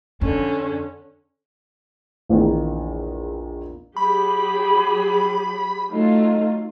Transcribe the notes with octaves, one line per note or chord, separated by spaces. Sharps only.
F2 D3 C#4
A#1 E2 D#3
F#3 G4 G#4 B5
F#3 A3 D#4 F4